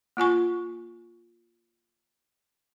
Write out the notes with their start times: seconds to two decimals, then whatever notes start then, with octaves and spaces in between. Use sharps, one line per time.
0.17 A#3 F4 G#5 C#6